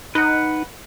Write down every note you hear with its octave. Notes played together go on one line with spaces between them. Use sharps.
D#4 B4 F#5